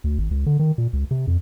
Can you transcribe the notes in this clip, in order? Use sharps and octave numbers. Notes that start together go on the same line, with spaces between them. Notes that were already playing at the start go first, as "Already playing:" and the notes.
D2
G#1
C#2
D3
D#3
A#2
C#2
C3
F2